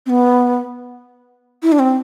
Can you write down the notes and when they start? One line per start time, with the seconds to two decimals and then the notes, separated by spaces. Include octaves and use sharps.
0.06 C4
0.10 B3
1.63 E4
1.72 D4
1.79 C4